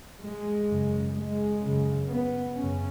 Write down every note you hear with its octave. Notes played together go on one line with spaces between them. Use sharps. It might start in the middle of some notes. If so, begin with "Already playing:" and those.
G#3
F#2 C#3
G#3
F#2 C#3
B3
F#2 C#3 C#4